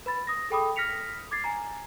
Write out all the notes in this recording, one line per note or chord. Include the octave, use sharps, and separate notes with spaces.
B4 B5 A6
D#6 A#6
G#4 A4 G5 B5 D6 D#6
F6 A#6 B6 C#7 F7
D6 G#6 A6 C7
G#5 A#5